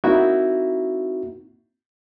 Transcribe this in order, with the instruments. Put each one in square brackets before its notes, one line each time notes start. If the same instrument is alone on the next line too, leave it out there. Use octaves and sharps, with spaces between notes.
[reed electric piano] A#3 C4 D#4 E4 F#4 E5